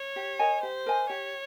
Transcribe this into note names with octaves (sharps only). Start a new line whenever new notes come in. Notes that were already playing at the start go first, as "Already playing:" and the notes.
Already playing: C#5
G4
A#4 D#5 G#5
G4 C5
A#4 D#5 G#5
G4 C#5